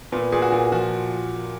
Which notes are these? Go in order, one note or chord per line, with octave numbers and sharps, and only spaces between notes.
A#2 B3
A#2 G#4
F#4
A#2
F3 F#4